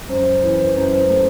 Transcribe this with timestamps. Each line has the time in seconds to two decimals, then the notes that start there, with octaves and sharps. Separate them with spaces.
0.09 F#2 C5
0.43 E3
0.76 F#2
1.09 A3